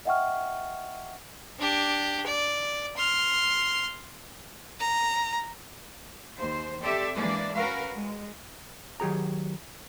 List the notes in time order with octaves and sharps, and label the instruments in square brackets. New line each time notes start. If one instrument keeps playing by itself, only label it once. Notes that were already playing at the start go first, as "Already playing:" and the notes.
[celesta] D#5 E5 F#5 G5 C#6 F6
[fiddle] D4 G4
D5
C6 F6
A#5
[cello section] D#2 C5
C4 G4 A4 D5 E5
E3 G#3 A#3 D4 D5
C#4 F#4 A#4 B4 F5
G#3
[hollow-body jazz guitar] D#3 F#3 G4 G#4 A#5